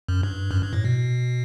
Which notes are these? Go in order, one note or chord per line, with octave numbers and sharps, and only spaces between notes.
F#2
G2
F#2
G2
A2
B2